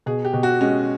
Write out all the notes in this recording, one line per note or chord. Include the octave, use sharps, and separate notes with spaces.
B2 G#4
G4
B2
F#4
G#3 C#4